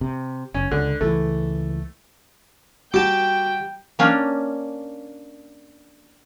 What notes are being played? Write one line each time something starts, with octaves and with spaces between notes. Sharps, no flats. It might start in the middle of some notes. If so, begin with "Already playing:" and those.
C3
F#1 C#4
C#2 D3
C#2 E3 A3
G3 F#4 G4 G5 A5
A#3 C#4 D4 F5